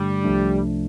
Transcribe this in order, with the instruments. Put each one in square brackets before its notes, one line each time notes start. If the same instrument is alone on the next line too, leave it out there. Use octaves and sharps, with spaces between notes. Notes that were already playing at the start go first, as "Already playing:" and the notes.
Already playing: [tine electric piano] G2 D3 A3 D4 G4 [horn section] G3
[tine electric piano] C2 C3 F3 A3 D4